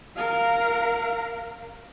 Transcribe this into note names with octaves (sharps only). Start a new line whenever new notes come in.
A#4 F5